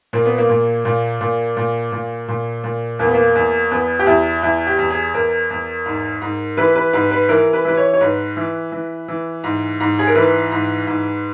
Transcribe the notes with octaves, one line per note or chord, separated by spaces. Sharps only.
A#2 A#3
B3
A#3
A#2
A#2
A#2
A#2
A#2
A#2
A#2
E2 A#3
B3
A#3
E2
E2 B3
G4
E2 E4
E2 E4
G4
E2
G#4
E2 A#4
E2
G#2
G#2
E3 B4
B4
G#2 B4
B4
E3 A#4
B4
E3 B4
C#5
C#5
G#2 B4
E3
E3
E3
G#2
G#2
G#4
A#4
E3 B4
G#2
G#2